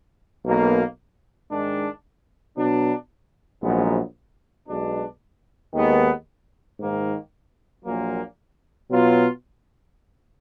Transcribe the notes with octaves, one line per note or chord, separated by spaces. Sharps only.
B1 B2 A#3
G#2 D#3 G#3 D4
B2 F#3 D4
A#1 G#2 F#3 B3
B1 B2 G#3 D4
D#2 D#3 G#3 B3
G#2 D#3 A#3
A#1 A#2 F#3 A#3
B2 F#3 B3 F4